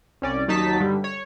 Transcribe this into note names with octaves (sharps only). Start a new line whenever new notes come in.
C2 C#4 D5
D#2 F#3 D#4 A5 B6
G2 D3 G3
C#5